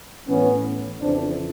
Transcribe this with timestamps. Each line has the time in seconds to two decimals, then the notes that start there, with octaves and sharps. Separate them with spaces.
0.28 A2 E3 B3 C#4
1.02 F2 C#3 E3 C4 D4